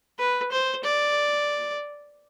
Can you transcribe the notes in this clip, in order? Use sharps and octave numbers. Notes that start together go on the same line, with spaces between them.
B4
C5
D5